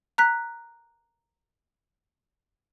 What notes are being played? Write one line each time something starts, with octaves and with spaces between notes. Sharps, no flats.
A#5 F#6 B6